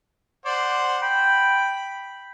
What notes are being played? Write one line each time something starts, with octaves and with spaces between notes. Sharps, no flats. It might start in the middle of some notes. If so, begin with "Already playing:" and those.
C5 D5 F#5
G5 B5